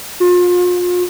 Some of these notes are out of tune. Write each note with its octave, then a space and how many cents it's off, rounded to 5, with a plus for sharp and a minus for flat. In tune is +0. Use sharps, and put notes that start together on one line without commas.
F4 +35